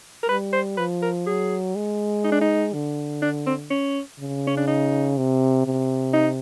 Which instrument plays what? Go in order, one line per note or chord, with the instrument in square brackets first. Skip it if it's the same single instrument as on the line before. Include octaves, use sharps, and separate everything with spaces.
[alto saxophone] A#4
[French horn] G3 [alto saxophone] B4
[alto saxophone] C5
[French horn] F3 [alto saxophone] B4
[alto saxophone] A#4
[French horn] F#3 [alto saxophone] G#4
[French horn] G#3
[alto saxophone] D#4
D4
D#4
[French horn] D3
[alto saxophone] D4
C4
C#4
[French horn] C#3
[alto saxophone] C#4
D4
D#4
[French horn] C3
C3
[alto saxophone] D#4